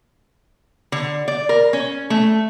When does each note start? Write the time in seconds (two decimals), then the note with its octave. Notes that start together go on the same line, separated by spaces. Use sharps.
0.92 D3
1.28 D5
1.49 A#4
1.73 C#4
2.10 A3